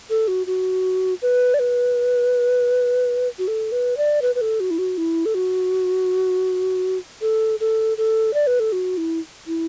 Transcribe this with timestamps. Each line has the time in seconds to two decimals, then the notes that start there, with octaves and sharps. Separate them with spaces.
0.10 A4
0.28 F#4
0.47 F#4
1.22 B4
1.54 D5
1.59 B4
3.39 F#4
3.48 A4
3.72 B4
3.97 D5
4.22 B4
4.35 B4
4.41 A4
4.60 F#4
4.71 E4
4.79 F#4
4.98 E4
5.26 A4
5.35 F#4
7.22 A4
7.60 A4
7.98 A4
8.34 D5
8.47 B4
8.60 A4
8.72 F#4
8.97 E4
9.47 E4